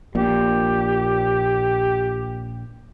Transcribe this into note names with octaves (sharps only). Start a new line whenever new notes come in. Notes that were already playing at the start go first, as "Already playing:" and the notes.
A#1 A#2 G4